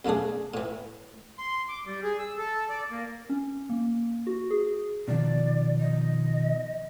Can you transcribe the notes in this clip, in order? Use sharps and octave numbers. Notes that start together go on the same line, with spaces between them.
B1 C#3 A3 D4 G#4
A2 E3
C6
D6
G3
G#4
E6
A4
D5
A#3
C#4
A#3
F#4
G#4
B2 D#3 F3 D5
D#5